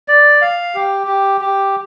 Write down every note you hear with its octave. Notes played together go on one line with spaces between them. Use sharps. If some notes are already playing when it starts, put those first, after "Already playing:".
D5
F5
G4
G4
G4